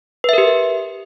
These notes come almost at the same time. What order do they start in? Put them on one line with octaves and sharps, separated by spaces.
B4 E5 A#4 G4